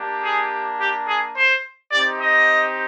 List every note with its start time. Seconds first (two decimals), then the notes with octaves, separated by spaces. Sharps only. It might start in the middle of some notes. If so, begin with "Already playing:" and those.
Already playing: A#3 D4 G4
0.22 G#4
0.79 G4
1.07 G#4
1.36 C5
1.92 C4 D#4 G4 D5
2.20 D#5